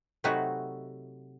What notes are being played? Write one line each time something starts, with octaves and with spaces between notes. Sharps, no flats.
C3 F#3 A3 D#4 F#4 B4